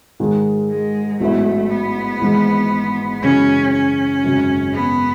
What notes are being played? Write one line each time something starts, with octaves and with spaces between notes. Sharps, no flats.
G#2 D#3 G#3
G#3
A1 G#2 F#3 A3 B3 E4
B3
G#1 G#2 E3 G#3
F#2 C#3 E3 G#3 C#4
C#4
G#1 F#2 C#3
B3